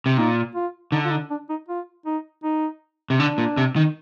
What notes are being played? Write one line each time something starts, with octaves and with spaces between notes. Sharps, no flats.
C3
A#2 D#4
F4
D3 D#4
F4
D#4
D4
D#4
F4
D#4
D#4
C3
D3 D4
A#2
C3
D#3